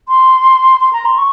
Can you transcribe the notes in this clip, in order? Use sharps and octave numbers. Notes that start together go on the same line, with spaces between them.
C6
C6
A#5
C6
C#6